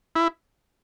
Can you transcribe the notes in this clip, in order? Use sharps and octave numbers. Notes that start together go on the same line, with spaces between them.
E4